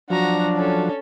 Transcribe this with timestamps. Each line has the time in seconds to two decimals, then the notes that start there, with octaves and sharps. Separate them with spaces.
0.10 F3 F#3 D4 F#4 A#5
0.56 C#4 A4